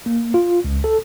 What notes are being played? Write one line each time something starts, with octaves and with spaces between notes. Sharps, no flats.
A#3
F4
C#2
A4